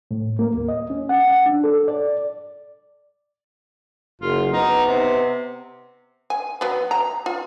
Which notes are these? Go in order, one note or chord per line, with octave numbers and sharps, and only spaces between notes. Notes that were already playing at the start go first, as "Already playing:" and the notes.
A2
A#3
D#2
D#5
C#4
F#5
F#5
D4
A4
D5
F#1 F4
B3 D#4
C3
G#5
F#3 B3
A#5
F4